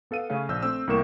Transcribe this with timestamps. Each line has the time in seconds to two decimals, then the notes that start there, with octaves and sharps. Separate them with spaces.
0.11 B3 A4 F5 D#7
0.30 C#3 A3 C#4 F5
0.49 A#1 E6 G6
0.62 A3 C4 E6
0.87 C2 A2 A#3 A#4 C#6 E7